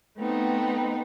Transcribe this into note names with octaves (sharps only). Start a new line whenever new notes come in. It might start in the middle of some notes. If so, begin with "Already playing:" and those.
A3 B3 C4 D#4